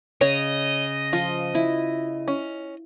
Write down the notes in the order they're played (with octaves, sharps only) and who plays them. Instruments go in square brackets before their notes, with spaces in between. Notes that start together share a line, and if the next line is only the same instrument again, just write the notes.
[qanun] C#3 [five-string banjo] C#5 [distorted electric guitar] D#5
[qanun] F3 [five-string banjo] F4
[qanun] E4
[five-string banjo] C#4